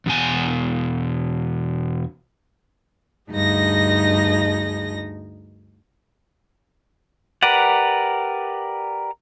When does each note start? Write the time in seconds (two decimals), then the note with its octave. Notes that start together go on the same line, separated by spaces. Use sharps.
0.06 E2 B2 G#5
3.30 D2 G2 D#4 G#4 D#5 A#6
7.43 G4 A#4 B4 D5 F#5